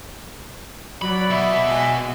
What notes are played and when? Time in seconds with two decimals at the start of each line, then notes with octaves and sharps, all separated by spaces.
1.02 F#3 C#5 D5 B5
1.30 B2 E5
1.68 G#3 F#4 G#5